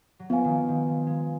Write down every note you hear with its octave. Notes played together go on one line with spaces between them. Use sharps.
F#3
F3 B3 F4 B4 F5 G#5
D#3 F3
D#3
F3
G#3